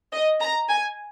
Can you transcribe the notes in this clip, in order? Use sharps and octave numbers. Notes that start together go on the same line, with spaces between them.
D#5
A#5
G#5